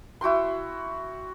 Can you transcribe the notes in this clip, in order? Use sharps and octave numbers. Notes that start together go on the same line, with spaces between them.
E4 F#4 G5 C6